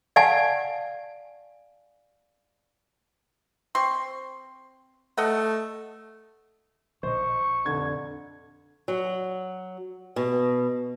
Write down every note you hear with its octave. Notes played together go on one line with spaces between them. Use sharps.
D5 F5 F#5 G#5 A5
C4 C6 C#6
A3 A4 D#5 F#5
A#1 C5 D#5 C#6
F1 D3 G#6
F#3
B2